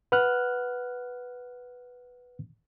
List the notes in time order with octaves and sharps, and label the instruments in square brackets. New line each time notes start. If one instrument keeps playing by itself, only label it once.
[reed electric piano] B4 F#5 F6 F#6